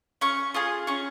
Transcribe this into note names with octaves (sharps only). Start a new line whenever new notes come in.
C#4 C#6
F4 G#4 D#6
C#4 C#6